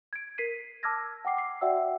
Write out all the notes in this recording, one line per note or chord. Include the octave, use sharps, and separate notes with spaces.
G#6 D7
A#4 B6 C7 D#7
A5 D6 E6 F6 G#6 A#6
F#5 G5 D6 C7
D6 C7
F#4 D5 E5 F#5 G5 E6